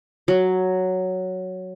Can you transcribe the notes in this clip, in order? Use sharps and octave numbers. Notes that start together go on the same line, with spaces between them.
F#3